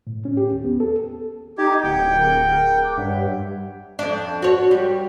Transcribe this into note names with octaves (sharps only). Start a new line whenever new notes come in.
A2
C#4
G4
D#2
B3
A4
D#4 G4 G#6
D1 F#5 G5
G#4 A#4 F#5
D6 F#6
G2 C#5 E5 F#5
F2 D4
F#4 C#5
G3